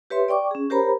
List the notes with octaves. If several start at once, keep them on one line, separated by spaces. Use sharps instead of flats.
G4 B4 C#5 E5 C6
D5 G5 C#6 D6
C#4 G#4
G4 A#4 C5 C#5 A#5 B5